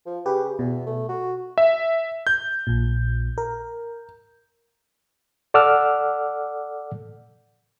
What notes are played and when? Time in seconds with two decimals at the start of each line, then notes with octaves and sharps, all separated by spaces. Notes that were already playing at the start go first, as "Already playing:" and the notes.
0.06 F3
0.26 C#3 G4 B4
0.59 E2 B2
0.87 A3
1.09 F#4
1.58 E5
2.27 G6
2.67 A#1 A#2
3.38 A#4
5.54 A4 D5 F#5 D6 E6 F6